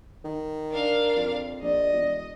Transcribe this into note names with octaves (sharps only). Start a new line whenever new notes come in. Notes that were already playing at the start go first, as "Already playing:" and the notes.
D#3
D4 A#4 F5
F2
A#1 D5 D#5
E1